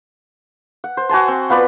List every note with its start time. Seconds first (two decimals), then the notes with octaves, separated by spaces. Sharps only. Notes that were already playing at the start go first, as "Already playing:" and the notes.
0.84 F#5
0.97 C5
1.09 F#4 G#5 A5 C6
1.28 C4
1.50 B3 F4 B4 D5